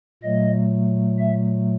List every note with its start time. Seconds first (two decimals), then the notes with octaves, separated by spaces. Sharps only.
0.23 A#2 F#3 A3 D#5
1.19 E5